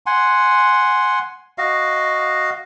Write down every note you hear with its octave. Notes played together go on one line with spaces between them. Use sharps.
F#5 G#5 C6
F#4 D#5 F5